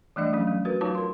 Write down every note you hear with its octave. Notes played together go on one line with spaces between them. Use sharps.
E3 G3 A3 D4 D5 D#5
F3 F#3 C#4
F#3
F#4 A#4 B4
F#3 D#4 F4 C#5 A5 D6
A#4 C6